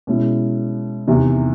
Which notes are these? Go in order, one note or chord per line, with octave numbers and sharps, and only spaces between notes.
B2 G#3 C#4 E4
E2 C3 D#3